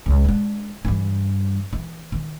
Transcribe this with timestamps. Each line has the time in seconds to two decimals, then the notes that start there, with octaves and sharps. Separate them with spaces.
0.06 C#2
0.25 G#3 D4
0.85 G2 E3
1.73 E3
2.12 D#3